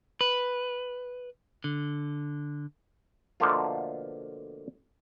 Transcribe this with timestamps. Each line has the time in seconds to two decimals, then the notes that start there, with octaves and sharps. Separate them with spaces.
0.21 B4
1.64 D3
3.40 B2 D3 F3 A3 A#3 F4